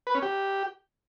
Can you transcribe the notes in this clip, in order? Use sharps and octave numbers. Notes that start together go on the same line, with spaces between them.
B4
C#4
G4